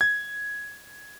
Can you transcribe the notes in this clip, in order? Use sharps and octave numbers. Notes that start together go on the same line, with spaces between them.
G#6